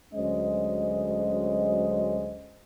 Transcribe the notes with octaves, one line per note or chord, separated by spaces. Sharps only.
D2 F#3 G#3 C#4 C5 D#5